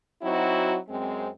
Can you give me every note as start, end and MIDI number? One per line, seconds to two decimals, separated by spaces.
0.23 0.78 54
0.23 0.78 60
0.23 0.78 63
0.23 0.78 64
0.23 0.78 66
0.89 1.28 42
0.89 1.28 56
0.89 1.28 60